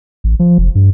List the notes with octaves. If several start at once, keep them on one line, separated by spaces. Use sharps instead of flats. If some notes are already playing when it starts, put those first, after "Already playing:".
A1
F3
F1
G2